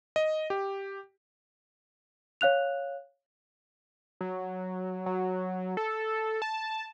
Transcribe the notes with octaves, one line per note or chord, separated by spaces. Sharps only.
D#5
G4
C#5 F5 F#6 F7
F#3
F#3
A4
A5